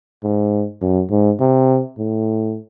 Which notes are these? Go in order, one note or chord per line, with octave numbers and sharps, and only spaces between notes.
G#2
F#2
G#2
C3
A2